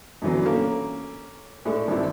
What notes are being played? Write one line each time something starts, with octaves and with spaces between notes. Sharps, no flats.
F#2 D3 E3 F#3 B3
A#3 C#4 A4
A2 G#3 A3 D4 A4
G#1 G2 C4 D4 E4